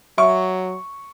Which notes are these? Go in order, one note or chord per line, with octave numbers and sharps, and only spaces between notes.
F#3 E5 C#6